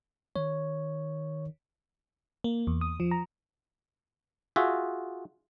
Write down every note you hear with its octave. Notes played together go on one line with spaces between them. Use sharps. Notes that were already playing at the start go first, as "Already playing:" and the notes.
D#3 C#5
A#3
E2
D#6
F3
A#5
F4 F#4 G#4 E5